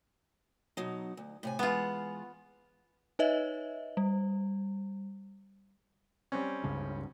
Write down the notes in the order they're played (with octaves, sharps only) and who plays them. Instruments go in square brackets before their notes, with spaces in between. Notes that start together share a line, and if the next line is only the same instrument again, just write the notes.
[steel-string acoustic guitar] B2 F#3 D#4
D2
A2 C3 G#5
[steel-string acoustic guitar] E3 G#3 F#5 [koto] B3 F4
[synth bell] D#4 B4 C#5 D#5 E5
G3
[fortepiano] G3 C4 C#4
[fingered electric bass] C#2 G2 C#3